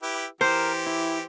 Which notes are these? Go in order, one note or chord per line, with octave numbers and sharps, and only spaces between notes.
E4 G4 B4
E3 G4 A#4 C5
E4